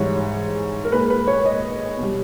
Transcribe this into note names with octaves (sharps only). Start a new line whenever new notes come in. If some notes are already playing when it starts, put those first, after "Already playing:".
Already playing: G#2 E3 G3 C#5
A#4
A#2 G#3 B4
B4
C#5
D#5
B2
G3